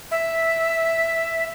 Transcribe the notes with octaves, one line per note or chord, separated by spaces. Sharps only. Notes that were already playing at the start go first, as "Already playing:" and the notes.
E5